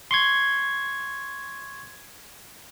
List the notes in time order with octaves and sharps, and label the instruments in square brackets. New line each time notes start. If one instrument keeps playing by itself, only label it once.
[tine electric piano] C6 C#6 G#6